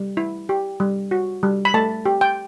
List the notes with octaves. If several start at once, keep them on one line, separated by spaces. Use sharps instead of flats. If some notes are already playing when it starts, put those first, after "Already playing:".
Already playing: G3
E4
G4
G3
F#4
G3
B5
A3 A5
G4
G5